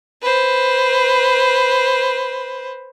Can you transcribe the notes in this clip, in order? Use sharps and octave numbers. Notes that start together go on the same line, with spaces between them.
B4 C5